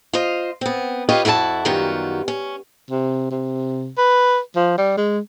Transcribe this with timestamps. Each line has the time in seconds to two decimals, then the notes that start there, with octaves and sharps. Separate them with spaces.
0.13 F4 C5 D#5
0.61 B3 C4
1.09 F4 G4 B4 C#5 D#5 F5
1.25 F2 E4 F#4 A4 A5
1.65 F#2 D#3 G3 B3 F4 F#4
2.28 C#4
2.91 C3
3.31 C3
3.98 B4
4.56 F3
4.78 G3
4.98 G#3